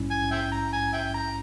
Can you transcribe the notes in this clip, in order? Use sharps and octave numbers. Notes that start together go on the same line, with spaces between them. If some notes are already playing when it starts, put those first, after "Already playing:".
Already playing: A#1 G#2 G3 C#4 E4
G#5
E5 G5
A#5
G#5
E5 G5
A#5